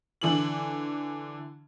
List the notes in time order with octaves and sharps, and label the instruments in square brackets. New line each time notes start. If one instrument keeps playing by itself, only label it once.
[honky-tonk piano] D3 E3 F#7